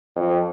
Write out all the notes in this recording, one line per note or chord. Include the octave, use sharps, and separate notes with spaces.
F2